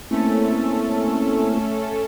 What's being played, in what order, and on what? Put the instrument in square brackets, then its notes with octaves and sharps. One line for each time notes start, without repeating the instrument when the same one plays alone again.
[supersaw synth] A3 C#4 A4 [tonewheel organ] A#3 C4 E4